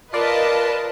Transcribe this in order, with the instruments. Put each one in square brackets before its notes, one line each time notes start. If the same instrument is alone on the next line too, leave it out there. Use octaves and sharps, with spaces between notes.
[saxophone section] F4 A#4 [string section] B4 D#5 A5 [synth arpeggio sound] D5